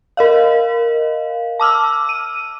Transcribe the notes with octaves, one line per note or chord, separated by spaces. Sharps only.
A#4 D#5 F5
A5 D6 E6 F6
D#7